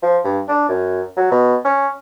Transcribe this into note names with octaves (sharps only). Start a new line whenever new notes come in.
F3
G2
D4
F#2
F#3
B2
C#4